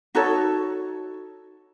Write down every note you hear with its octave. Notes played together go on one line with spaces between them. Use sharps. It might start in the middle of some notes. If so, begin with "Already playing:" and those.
D#4 F#4 A4 C#5